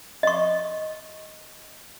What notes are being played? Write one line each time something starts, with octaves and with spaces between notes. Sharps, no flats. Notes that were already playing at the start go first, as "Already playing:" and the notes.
D#5 C#6